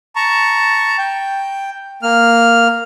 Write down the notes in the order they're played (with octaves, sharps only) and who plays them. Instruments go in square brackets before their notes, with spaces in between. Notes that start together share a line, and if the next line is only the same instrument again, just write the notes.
[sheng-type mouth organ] A5 A#5 C#6
G5
A#3 F6